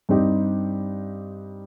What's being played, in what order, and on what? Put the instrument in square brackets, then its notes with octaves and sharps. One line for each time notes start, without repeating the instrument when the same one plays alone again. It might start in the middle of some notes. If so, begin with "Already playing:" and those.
[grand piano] G2 G3 C4 D#4 G4